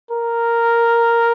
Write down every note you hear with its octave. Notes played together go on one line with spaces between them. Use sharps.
A#4